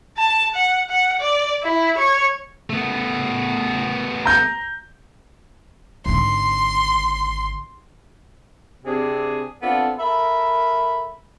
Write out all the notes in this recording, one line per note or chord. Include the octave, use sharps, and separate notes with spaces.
A5
F#5
F#5
D5
E4
C#5
A3 B3
A#5 G6
G#1 D3 C6
C3 C4 D4 G4 G#4
B3 C4 D4 F4 A4
A4 A#4 E5 B5